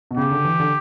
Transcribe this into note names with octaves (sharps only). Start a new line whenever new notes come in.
B2
C#3 G4
D3
E3
D3